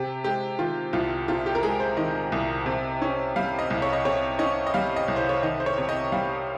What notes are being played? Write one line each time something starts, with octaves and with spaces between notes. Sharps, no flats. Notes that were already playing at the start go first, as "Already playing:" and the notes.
Already playing: C3 G4
G#3 G4
D#3 F4
C2 F4
C3 F4
G4
A#4
G#3 G#4
C5
D#3 D#5
C2
C3
C#4
G3 F5
D#5
C2
C#5
D#5
C3 C#5
C#4 D#5
D#5
G3 F5
D#5
C2
C5
C#5
D#3 D#5
C5
C#5
C3
D#5
G3 F5